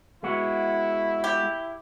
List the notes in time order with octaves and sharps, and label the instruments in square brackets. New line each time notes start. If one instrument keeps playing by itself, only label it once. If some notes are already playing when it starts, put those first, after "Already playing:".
[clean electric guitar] G#3 B3 F#4 [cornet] E4
[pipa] G4